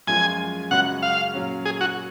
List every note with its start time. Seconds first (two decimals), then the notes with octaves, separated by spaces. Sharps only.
0.07 F#2 F3 G#3 C#4 F4 G#5
0.71 F#2 C#3 G#3 C#4 F#4 F#5
1.02 F5
1.34 A#2 F#3 C#4
1.65 G#4
1.81 F#4